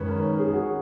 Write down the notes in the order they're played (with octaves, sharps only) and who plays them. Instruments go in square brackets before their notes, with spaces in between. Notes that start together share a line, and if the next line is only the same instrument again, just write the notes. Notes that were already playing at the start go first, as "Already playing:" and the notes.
Already playing: [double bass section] F#2 D#3 G#3 C#4 [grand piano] B4 C#5
[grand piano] A#4
G#4
F#4